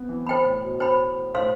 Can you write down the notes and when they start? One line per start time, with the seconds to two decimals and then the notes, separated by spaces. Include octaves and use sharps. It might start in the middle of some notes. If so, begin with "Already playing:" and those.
Already playing: B3 C4
0.09 E3
0.27 C5 G5 B5
0.45 A2
0.63 B2
0.80 C5 G5 B5
1.34 A2 C5 F5 C6